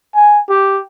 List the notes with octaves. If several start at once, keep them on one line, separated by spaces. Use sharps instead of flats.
G#5
G4